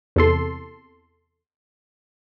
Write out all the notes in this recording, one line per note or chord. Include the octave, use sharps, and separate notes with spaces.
E2 C3 A4 C6